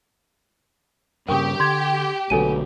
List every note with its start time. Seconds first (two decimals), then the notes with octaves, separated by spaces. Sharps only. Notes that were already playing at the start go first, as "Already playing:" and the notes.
1.28 G2 C#3 G4 A#4 G5 C#6 D#6
1.60 D3 C6 G#6
2.30 B1 D3 F#3 A3 B3 A4 G#5 D#7